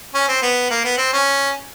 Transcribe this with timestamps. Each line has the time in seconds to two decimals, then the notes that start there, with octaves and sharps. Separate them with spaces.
0.14 C#4
0.28 C4
0.42 B3
0.70 A#3
0.84 B3
0.98 C4
1.13 C#4